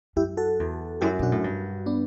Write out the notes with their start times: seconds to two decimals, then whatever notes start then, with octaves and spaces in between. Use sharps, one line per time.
0.16 F#2 E4 G4
0.37 F#4 A4
0.59 E2
1.01 F#2 E4 G4
1.19 B2 D4 F#4
1.32 A2
1.44 G2
1.86 B3 D4